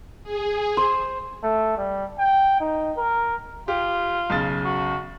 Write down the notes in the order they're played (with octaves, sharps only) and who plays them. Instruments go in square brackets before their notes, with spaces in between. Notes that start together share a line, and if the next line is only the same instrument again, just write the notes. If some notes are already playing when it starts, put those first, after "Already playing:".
[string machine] G#4
[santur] C5
[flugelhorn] A3
G3
G5
D#4
A#4
[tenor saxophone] F4 [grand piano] G4
[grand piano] B1 C#3 A6
[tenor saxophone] F#4